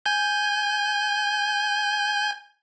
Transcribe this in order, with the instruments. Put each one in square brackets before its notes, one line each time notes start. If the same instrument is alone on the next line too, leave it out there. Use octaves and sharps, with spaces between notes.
[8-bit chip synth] G#5 G6